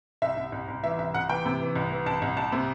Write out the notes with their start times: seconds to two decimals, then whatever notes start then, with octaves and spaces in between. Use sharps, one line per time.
0.22 C2 E5
0.37 C2
0.52 C2
0.68 C2
0.84 E3 E5
0.99 C2 E5
1.14 C2 F#5
1.29 E3 G5
1.45 C3
1.60 E3
1.76 C2
1.91 E3
2.06 C2 A5
2.22 C2
2.37 C2 A5
2.52 C3